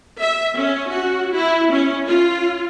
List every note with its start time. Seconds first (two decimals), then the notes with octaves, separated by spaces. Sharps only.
0.20 E5
0.57 C#4
0.92 F#4
1.34 E4
1.72 C#4
2.07 F4